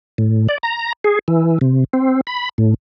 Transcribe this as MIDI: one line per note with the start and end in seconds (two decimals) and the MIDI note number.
0.18 0.47 45
0.49 0.58 74
0.63 0.93 82
1.04 1.19 68
1.28 1.58 52
1.61 1.84 48
1.93 2.21 60
2.27 2.49 83
2.58 2.74 45